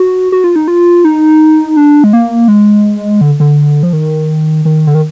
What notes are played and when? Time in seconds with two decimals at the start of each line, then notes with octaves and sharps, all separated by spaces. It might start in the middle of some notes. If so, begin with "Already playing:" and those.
Already playing: F#4
0.32 F#4
0.44 F4
0.56 D#4
0.68 F4
1.04 D#4
1.77 D4
2.04 G#3
2.13 A#3
2.48 G#3
3.21 D3
3.40 D3
3.83 F3
3.93 D#3
4.65 D#3
4.87 D3
4.94 D#3